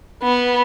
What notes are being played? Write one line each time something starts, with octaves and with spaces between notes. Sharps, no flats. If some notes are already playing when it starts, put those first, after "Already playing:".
B3